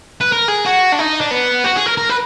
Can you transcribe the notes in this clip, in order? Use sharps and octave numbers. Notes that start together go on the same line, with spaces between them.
B4
A#4
G#4
F#4
D4
D#4
D4
B3
F#4
G#4
A#4
A#4
B4